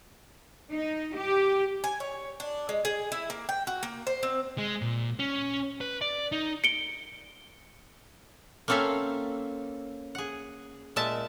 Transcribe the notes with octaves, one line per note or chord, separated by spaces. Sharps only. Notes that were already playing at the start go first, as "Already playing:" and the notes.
D#4
G4
G#5
C#5
D4
G#3
G#4
E4
A#3
G5
F#4
A#3
C5
C4
G#3
A#2
C#4
B4
D5
D#4
C#7 D7 G7
A#3 C4 C#4 A4 E5 F5
G#4 F#5
A#2 G#3 E5 A5